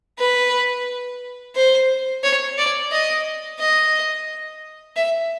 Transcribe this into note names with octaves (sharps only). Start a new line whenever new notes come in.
B4
C5
C#5
D5
D#5
D#5
E5